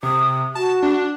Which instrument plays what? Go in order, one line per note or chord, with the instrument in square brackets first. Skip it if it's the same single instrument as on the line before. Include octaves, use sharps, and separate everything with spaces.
[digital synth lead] C3 [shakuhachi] D#6
[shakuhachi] F#4 [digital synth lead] A5
[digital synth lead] D4